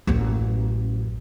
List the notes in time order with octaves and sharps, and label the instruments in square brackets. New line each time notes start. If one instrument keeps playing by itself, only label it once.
[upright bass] A1 F#2